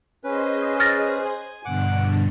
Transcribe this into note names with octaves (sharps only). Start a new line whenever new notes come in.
C#4 G#4 B4 C5 D#5
F6 A6 A#6
G#5
G2 B2 D3 F#5 D6